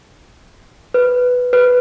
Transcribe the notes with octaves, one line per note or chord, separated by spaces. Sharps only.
B4
B4